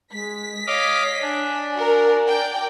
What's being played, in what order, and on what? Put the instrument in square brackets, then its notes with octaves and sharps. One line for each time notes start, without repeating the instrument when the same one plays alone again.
[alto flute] G#3 [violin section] B6
[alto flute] C#5 [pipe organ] D#5 F5 D6
[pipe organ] D4 [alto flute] G#5
[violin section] F#4 A#4
A#4 D5 G5